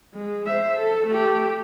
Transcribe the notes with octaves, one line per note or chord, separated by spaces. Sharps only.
G#3
C5 E5
A4
A3 G4